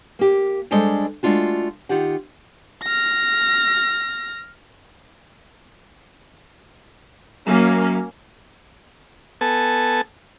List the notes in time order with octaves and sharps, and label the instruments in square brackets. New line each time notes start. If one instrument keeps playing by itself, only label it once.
[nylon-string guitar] A#3 G4
G3 G#3 D4 A4 C5 D#5
G#3 A3 D4 F4 F#4
D#3 F4 G4 F#5
[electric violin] F6 A#6
[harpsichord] F#2 [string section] A#3 C#4
[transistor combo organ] B3 A4 G#5 A5